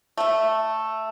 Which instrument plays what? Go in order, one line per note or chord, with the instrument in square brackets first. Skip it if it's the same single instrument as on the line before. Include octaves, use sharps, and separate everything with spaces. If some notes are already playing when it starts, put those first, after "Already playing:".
[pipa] A3 E5